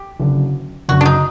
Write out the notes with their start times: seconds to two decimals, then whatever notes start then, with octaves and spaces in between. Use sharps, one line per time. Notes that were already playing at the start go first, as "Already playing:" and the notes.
Already playing: G4
0.20 F#1 F#2 D3
0.89 F#1 F#2 D3 F#4
1.01 D4
1.05 D#4